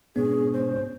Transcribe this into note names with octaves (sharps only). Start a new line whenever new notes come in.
G#2 B2 B3 C#4 D4 G#4
C5